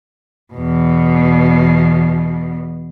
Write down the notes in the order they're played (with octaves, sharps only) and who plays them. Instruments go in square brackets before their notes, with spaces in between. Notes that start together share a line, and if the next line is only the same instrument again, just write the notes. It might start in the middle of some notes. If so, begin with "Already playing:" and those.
[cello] E2 B2